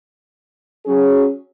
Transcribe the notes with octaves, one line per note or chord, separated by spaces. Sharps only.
F#3 C#4 G#4